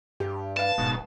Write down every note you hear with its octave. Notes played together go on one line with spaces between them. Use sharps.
G2 G4
B4 F5 A5
D1 G#2 B2